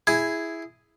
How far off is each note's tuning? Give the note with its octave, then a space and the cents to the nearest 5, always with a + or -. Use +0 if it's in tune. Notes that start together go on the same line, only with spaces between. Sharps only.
E4 +0 G#4 +0 G#5 +0